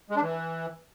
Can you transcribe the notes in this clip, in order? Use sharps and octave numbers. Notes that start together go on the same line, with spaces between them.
G#3
D4
E3